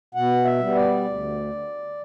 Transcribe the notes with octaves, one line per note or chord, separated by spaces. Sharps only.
B2 F#5
E5
G3 B3
D5
D2